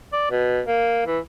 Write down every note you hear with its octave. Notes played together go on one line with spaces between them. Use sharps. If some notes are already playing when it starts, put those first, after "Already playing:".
D5
B2
A#3
E3